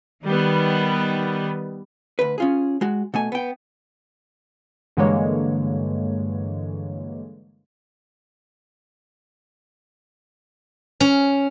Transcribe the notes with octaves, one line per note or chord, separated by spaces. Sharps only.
D#3 G3 B3
D2 B4
C#4 F4 G#4
G#3 F#4
B2 A3 G#5
B3 G5
G2 D3 E3 G#3 A#3 C#5
C#4